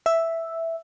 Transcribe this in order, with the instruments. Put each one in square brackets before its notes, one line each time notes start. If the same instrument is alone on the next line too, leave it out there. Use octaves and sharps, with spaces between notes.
[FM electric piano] E5